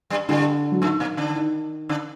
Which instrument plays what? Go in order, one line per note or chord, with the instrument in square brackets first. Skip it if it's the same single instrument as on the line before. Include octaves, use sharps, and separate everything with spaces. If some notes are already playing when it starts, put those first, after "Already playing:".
[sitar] G2 G3
[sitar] G2 G3 [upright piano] D3
[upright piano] F#3
[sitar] A2 A3 [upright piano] D#3
[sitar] A#2 A#3
D3 D4
[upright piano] D#3
[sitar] D3 D4